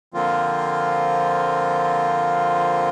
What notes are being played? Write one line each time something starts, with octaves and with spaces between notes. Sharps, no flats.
D3 F3 A#3 C4 F4